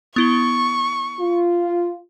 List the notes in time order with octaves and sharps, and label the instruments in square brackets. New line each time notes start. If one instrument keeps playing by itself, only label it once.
[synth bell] B3 E4 G7 [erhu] C#6
[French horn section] F4